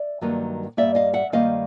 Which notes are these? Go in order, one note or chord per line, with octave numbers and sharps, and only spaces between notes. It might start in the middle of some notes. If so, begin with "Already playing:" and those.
Already playing: D5 E5
G2 D#3 F#3 A#3
G2 D#3 G3 A#3 D5 E5
D#5 F5
E5 F#5
G2 D#3 G3 A#3 D#5 F5